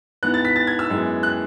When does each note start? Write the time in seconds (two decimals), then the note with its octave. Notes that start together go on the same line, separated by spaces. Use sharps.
0.23 G#2 E3 B3 F#6
0.34 A6
0.45 B6
0.56 A6
0.67 G#6
0.79 E6
0.90 F#2 E3 G#3 B3
1.23 F#6